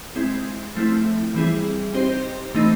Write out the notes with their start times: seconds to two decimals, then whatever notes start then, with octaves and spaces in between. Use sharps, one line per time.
0.16 G#3 C4 E4
0.75 F3 A3 C4 E4
1.34 E3 G3 C4 E4 G#4
1.94 C4 D#4 G4 C5
2.55 E3 A3 C4 D#4